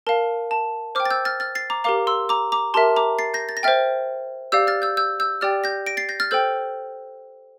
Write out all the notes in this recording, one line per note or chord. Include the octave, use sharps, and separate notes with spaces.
A#4 F5 A5
A5
C5 G5 D6 F6
A6
E6 G6
F6 A6
F6 A6
A6 C7
A#5 D6
G4 A#4 F5 A#5 D6
C6 E6
A#5 D6
A#5 D6
G4 A#4 E5 A5 C6
A#5 D6
A6 C7
G6 A#6
A6
A#6
C5 E5 G5 F6 A6
G4 D5 F5 E6 G6
F6 A6
E6 G6
E6 G6
E6 G6
G4 D5 G5 F6 A6
G6 A#6
A#6 D7
A6 C7
G6 A#6
F6 A6
A4 C5 G5 E6 G6